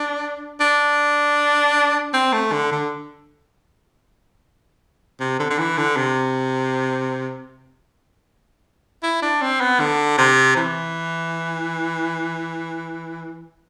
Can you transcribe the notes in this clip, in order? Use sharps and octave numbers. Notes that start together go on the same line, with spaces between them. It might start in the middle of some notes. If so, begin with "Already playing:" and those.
Already playing: D4
D4
C4
A3
D3
D3
C3
D3
D3
E3
D3
C3
E4
D4
C4
B3
D3
C3
E3